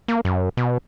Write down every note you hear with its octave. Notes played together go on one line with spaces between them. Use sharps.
A#3
F#2
B2